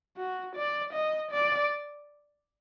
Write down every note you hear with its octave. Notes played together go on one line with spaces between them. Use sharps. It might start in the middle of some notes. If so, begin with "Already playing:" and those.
F#4
D5
D#5
D5